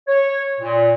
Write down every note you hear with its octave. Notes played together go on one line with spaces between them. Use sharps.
C#5
A#2